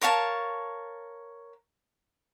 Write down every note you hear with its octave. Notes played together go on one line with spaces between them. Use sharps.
A#4 C#5 F5 A5